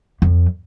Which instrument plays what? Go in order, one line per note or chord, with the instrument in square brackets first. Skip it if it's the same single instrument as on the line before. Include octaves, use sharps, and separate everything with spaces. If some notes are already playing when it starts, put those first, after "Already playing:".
[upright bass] F2